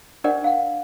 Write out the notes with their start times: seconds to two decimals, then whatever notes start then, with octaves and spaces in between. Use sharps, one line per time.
0.24 D4 G4 A#4 C5 D5 F#5
0.44 F5 F#5